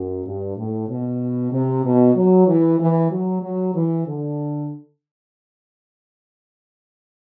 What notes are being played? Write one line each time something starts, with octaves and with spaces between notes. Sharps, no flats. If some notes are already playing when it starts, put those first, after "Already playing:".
Already playing: F#2
G2
A2
B2
C3
B2
F#3
E3
E3
F#3
F#3
E3
D3